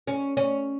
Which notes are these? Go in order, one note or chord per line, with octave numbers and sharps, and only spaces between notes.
C#4
C#4